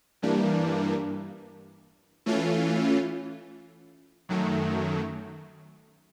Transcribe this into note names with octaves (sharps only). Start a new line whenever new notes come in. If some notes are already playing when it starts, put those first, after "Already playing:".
G2 E3 G3 A#3 D4
E3 A3 C#4 F4
F#2 D#3 F#3 A3